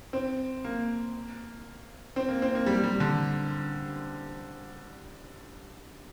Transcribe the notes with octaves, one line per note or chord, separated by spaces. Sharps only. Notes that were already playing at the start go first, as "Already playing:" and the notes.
C4
A#3
C4
A#3
C4
A#3
G3
G3
D3